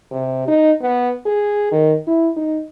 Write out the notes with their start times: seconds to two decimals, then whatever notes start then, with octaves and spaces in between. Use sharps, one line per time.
0.12 C3
0.48 D#4
0.82 B3
1.26 G#4
1.72 D#3
2.07 E4
2.37 D#4